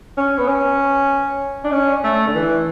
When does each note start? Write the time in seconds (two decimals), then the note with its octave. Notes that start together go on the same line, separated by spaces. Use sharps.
0.17 C#4
0.39 B3
0.48 C#4
1.64 D4
1.72 C#4
2.04 A3
2.27 D3
2.35 E3